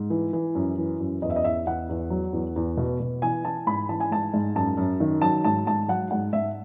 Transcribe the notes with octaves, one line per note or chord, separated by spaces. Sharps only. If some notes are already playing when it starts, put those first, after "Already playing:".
Already playing: G#2
E3
E3
F#2
E3
F#2
E2 D#5
E5
D#5
E2 E5
E2 F#5
E2
F#3
E2
E2
B2
B2
E3 G#5
E3 A5
G#2 B5
E3 A5
G#5
G#2 A5
G#2
F#2 A5
F#2
D#3
F#3 A5
G#2 A5
G#2 A5
F#3 F#5
G#2 F#5
G#2 E5